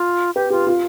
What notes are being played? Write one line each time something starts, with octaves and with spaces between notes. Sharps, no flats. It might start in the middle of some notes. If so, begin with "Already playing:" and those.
Already playing: F4
G4 B4
F4 G4
F4